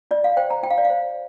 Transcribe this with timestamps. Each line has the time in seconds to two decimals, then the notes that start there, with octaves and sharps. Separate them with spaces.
0.11 F4 D5
0.24 F5
0.37 C5 G5
0.50 A#5
0.63 F4 G5
0.70 F5
0.78 D5
0.85 F5
0.90 C5